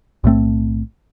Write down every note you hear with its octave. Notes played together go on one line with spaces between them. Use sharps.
B1 A2 A3 C4